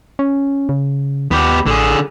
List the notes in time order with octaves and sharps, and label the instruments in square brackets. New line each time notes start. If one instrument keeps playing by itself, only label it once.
[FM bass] C#4
C#3
[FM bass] D#2 [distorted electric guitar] B3 G4
[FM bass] A1 [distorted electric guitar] D3 G#4